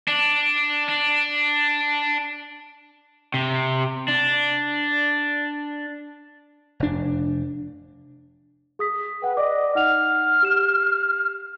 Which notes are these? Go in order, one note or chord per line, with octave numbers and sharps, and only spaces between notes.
D4
D4
C3
D4
F1 D4
G#4 D#6 B6
B4 F#5 G5
D5 D#5 D6
D#4 F#5 F6 F7
G4 E7